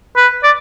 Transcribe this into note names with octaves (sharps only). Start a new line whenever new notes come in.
B4
D5